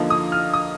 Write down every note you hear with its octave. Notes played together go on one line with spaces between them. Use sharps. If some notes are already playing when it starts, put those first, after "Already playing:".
Already playing: D3 F3 A#3 D#4
D#6
F6
D#6